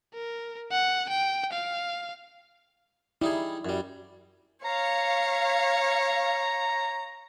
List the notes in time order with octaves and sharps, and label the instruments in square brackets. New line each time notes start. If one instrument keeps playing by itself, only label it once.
[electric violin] A#4
F#5
G5
F5
[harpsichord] G3 D#4 G#4 [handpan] E4
[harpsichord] F#2 G3
[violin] C#5 [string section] F5 C#7 [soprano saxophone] A#5